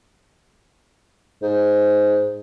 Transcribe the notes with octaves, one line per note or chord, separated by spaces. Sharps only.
G#2